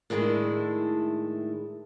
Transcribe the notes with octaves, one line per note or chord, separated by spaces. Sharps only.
A2 D#3 G#3 D4 E4